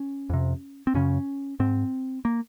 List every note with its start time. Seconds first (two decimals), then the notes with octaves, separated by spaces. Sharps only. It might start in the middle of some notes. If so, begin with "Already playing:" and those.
Already playing: C#4
0.30 F2 C3
0.87 C4
0.94 F#2 C#3 C#4
1.60 G#2 C4
2.25 A#3